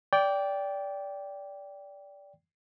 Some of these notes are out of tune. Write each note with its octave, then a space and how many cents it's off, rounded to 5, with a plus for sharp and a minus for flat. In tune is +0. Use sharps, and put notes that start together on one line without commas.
D5 -20 G5 +0